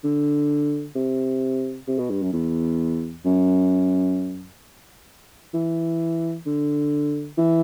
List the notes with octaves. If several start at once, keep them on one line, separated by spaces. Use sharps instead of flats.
D3
C3
C3
B2
G2
F#2
E2
F#2
E3
D3
E3